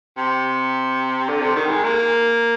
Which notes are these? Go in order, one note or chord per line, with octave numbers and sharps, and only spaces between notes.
C3
D3
C3
D#3
G#3
A#3